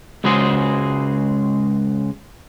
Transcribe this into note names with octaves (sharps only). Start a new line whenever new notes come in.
C#2 C#3 G#3 F#4 G#4 C5